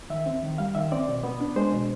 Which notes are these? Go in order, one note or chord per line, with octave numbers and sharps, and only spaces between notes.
D#3 E5
C4
D#3
G3 F5
D#3 E5
C4 D5
B2
B3
D4
G#3 C5
B2